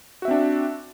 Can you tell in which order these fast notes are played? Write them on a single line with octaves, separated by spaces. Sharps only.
F#4 E5 C4 D4